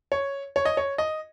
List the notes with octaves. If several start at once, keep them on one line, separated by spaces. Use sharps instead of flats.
C#5
C#5
D#5
C#5
D#5